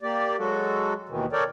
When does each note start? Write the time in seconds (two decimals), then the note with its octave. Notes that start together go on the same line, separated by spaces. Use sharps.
0.02 A#3 G4 D5
0.39 F#3 G#3 F#4 A4
1.09 D#2 B2 D#3 E3
1.32 A4 A#4 C#5 D5 G5